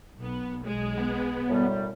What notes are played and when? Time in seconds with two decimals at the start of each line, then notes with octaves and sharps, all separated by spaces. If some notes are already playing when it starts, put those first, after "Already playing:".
0.17 B1 B3
0.64 B1 G#3
0.97 B3
1.48 F#2 A2 G3